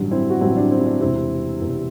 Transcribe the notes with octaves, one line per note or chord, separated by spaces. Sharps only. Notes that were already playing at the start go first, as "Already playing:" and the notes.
Already playing: A1 G2 D3 F#3
C4 E4
F#4
A1 G2 D3 F#3 C4 E4
D4
C4
E4
D4
E1 E2 C3 C4 E4
E1 E2 C3